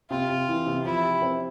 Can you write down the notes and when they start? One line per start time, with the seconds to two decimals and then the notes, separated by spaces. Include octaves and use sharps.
0.10 C3 F4
0.29 C3
0.48 E3
0.66 C3
0.85 F3 E4
1.03 G4
1.22 C4